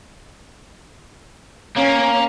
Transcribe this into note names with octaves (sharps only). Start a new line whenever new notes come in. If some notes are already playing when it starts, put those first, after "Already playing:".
A#3 C#4